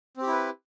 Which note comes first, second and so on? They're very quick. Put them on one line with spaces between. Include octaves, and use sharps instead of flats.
C4 G4 E4 B4